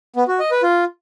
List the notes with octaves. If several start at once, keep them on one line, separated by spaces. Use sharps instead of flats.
B3
F#4
D#5
B4
F4